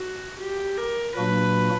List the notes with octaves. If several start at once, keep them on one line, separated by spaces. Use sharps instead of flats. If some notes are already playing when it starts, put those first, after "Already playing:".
Already playing: F#4
G4
A#4
A#2 F#3 A#3 D4 F#4 B4